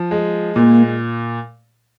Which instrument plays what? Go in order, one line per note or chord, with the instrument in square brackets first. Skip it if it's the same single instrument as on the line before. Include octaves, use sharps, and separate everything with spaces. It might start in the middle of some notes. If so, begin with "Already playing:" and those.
Already playing: [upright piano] F3
G#3
[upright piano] A#2 [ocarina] A#3